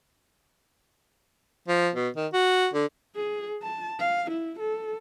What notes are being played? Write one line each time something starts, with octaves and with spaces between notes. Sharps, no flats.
F3
B2
D#3
F#4
D3
G#4
A5
F5
E4
A4